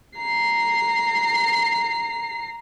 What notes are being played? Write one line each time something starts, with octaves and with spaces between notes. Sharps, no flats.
A#5 C7